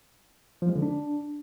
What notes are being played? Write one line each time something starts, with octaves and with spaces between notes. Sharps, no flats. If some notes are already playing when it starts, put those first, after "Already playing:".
F3
G#3
D3
D4